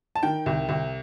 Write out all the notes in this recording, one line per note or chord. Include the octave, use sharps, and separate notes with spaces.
A5
D#3 G5
C2
C2